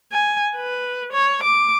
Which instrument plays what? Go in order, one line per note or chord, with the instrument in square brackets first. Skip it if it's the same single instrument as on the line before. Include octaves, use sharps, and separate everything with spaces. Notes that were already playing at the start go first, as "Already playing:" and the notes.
[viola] G#5
B4
C#5
D6